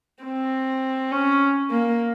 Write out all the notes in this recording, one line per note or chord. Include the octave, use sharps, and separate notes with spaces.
C4
C#4
A#3